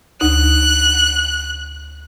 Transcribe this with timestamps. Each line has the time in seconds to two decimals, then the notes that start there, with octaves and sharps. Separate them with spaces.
0.21 D2 D#4 F#6